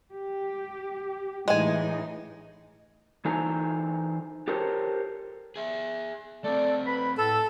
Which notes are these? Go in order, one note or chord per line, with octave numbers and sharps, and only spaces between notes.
G4
A2 E3 G#3 D#4 G#5
E3 D#4 A4 C5 G#5 A#5
G4 A4 A#4 C5 C#5
G#4 E5
A3 C4 A4 D5
B4 B5
A2 A4 E6